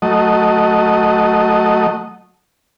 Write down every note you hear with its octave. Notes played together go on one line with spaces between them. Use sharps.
F#3 A3 D#5